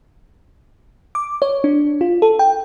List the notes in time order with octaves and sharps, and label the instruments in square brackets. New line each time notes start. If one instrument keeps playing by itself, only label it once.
[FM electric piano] D6
C#5
D4
F4
A4
G5